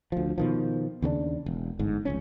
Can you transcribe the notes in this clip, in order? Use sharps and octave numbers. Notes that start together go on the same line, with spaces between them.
D2 F3
B2 D#3 F3
D#2 C#3 B3 D4
E1
G1 G#2
F1 C#2 C#4